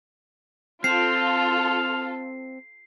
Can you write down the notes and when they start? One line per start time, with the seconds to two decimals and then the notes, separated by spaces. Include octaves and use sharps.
0.84 C4 F4 A4 F6 C7